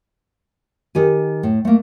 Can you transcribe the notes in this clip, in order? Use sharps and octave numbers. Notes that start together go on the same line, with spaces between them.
D#3 G4 G#5
A2
A3 A#3